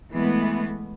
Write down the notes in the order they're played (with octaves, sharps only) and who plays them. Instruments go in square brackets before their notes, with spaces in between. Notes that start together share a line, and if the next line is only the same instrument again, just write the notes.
[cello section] E3 G#3 A3 B3